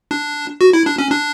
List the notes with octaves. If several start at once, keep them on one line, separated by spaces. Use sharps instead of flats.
D4
F#4
E4
D4
C#4
D4